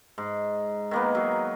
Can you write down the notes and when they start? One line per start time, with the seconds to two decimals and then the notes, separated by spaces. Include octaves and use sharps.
0.18 G#2
0.91 D#3 A#3 B3
1.15 F#3